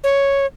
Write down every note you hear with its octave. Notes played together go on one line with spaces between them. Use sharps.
C#5